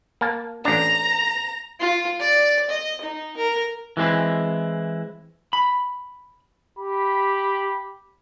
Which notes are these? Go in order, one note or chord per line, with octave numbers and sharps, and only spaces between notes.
A#3 A5
A1 D4 A#5
F4
D5
D#5
D#4
A#4
E3 G#3 C4 E4
B5
G4 B5